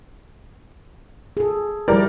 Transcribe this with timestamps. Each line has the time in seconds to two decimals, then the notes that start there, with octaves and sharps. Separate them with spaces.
1.37 G#4 A4
1.88 F3 G3 E4 A#4 D5